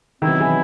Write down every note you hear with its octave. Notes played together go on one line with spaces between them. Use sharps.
B2 D#3 F#3 C4 E4
E3